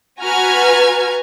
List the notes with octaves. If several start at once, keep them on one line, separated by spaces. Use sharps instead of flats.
F#4 B4 G#5 A#5 F6 G#6